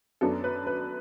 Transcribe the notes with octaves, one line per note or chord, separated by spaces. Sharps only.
F#2 F#3 B3 D4 A4
B4
B4